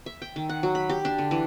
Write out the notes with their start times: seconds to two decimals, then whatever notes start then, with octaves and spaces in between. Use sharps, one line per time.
0.06 E5
0.22 G5
0.36 D#3
0.49 F#5
0.63 F#3
0.75 B5
0.89 G4
1.05 D4
1.18 D3
1.31 E3